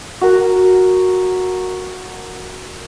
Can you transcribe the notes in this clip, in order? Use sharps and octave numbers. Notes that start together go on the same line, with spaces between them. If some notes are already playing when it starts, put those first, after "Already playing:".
F#4 A#4